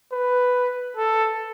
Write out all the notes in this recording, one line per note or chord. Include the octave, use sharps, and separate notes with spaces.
B4
A4